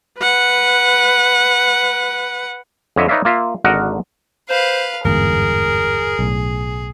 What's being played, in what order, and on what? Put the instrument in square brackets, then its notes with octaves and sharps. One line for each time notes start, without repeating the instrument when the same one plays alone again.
[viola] B4 F#5
[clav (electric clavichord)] F2 D3 C#5 D#5 E5
D#4 B4 C#5 D5 E5 F5
A#3 F4 E5
G#1 D3 F#4 A#4 D#5 F#5
[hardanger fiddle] B4 F5 [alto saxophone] C5
[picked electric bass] G1 E2 G#2 [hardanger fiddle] G#4 [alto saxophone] A#4
[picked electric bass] B1 A2